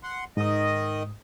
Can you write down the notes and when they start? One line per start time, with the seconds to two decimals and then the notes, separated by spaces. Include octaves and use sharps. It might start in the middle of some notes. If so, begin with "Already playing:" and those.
0.03 F#5 C6
0.37 G#2 D#3 D#5 D#6